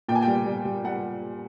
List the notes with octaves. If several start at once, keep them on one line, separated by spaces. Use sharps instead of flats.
A#2 G5
G#5
G5
G3
G3
G3
G3 F#5